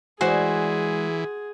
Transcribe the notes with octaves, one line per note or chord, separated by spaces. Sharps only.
E3 G#3 F#4 G#4 C5 D5 G#5